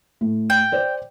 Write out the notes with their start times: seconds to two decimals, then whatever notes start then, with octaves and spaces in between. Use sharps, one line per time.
0.21 A2
0.50 G5
0.72 C5 D5